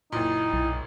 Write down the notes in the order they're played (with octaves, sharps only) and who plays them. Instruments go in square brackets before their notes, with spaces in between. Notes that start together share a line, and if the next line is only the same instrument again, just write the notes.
[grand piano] F#1 A#2 [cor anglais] D#4 [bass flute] E4
[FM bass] B1